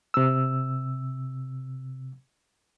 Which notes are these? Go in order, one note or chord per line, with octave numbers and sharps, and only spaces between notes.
C3 E6